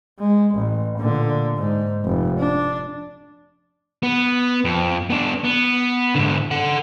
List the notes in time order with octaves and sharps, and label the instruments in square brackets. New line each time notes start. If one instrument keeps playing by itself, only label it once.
[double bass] G#3
A1
A#2 D3
G#2
F1
D4
[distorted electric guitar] B3
F2
B3 D4
B3
G#2 D3
A4 F#5